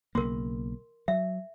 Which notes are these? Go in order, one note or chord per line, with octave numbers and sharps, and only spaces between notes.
B1 C#3 A#3 A#4 C6
F#3 E5